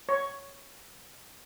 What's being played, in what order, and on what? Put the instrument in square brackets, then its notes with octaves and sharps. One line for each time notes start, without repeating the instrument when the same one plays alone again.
[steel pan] C#5